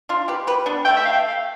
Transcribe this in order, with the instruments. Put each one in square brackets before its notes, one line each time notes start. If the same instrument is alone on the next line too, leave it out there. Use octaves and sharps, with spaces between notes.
[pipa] D4 F4
G4 B4
G4 B4
B3 D4
[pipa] A3 [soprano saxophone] G5
[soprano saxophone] E5
F5
G5
F5